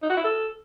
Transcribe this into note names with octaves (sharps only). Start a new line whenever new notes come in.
D#4
F#4
E4
A4